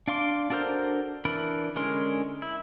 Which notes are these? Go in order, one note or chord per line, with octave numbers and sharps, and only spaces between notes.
D4 F5 C6 D6
D4 F#4 A4 A#4 C5
E3 D4 A#4 B5
D3 G#3 C#4 A#4 C6
E4